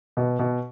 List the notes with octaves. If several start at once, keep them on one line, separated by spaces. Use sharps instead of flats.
B2
B2